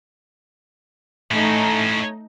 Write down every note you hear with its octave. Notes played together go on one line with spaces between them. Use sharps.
A2 A3 C#4 D#4